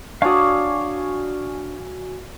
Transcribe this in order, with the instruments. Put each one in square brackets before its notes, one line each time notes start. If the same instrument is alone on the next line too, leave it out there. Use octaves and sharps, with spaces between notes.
[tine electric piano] D4 [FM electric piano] F#4 G#5 [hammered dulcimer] C#5 D5 [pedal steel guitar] F5 D#6